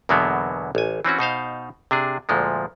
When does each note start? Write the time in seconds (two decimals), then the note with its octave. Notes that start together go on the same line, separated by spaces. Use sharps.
0.09 E2 B2 D3 F#3 A#3 B3
0.75 A1 G#5
1.05 E3 C4 C#4 F#4
1.19 B2 D#4 C5 F5
1.91 C3 D4 G#4
2.29 D2 A#2 F3 G#3